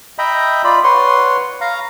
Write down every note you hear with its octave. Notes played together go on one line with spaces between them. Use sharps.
D#5 E5 G5 A#5 B5
F4 D5 B5
B4 C#5 F#5 C6
F5 A#5